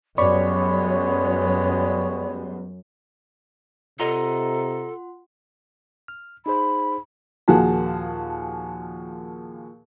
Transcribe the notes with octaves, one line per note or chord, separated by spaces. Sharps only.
F#2 G3 G#3 B3 C#5 D5 B5 C#6
C3 F4 A4 D#5 F#5 A#5 C6
F6
D#4 G#4 C5 B5
D#2 A#2 F3 F#4 G#4 A5